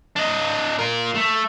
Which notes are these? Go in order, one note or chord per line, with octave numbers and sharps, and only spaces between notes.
D4 D#5
F4 A#4
A3